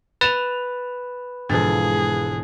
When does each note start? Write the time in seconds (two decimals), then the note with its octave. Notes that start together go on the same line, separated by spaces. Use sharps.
0.21 B4 A6 E7 F7
1.49 E1 G#2 D3 F3 G#4 A6